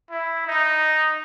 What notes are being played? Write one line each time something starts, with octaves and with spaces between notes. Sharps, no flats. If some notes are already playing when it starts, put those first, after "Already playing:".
E4
D#4